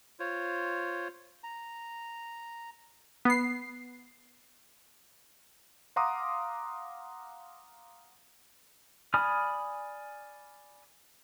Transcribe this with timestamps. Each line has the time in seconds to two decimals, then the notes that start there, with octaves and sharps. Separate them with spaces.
0.20 F4 C5 C#5
1.43 A#5
3.25 B3 C7
5.96 F5 F#5 A#5 C6 D6 D#6
9.14 D5 G#5 B5 D#6 F6